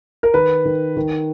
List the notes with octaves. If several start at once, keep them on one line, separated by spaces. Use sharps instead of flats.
A#4
D#3 B4
D#3
D#3